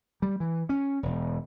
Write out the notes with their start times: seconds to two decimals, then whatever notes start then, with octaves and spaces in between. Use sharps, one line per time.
0.22 G3
0.40 E3
0.69 C#4
1.03 E1